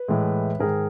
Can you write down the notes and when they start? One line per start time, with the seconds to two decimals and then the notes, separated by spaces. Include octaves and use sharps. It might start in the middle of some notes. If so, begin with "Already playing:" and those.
Already playing: B4
0.08 A2 E3 G#3
0.59 G#2 D#3 G#3 G#4 A#4